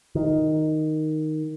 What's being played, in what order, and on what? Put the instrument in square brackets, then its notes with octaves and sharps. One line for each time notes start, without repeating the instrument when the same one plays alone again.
[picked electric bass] D#3